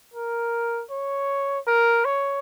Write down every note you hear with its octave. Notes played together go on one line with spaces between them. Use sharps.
A#4
C#5
A#4
C#5